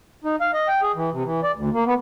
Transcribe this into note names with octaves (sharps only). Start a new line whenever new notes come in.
D#4
F5
D#5
G5
G#4
E3
C3
E3
D5
D2
A#3
B3